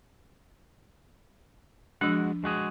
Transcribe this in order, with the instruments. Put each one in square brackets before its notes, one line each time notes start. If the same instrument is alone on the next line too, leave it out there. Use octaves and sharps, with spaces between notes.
[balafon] F3 D4 [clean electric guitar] G#3 F#4 F#5
[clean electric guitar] G#3 F#4 G#4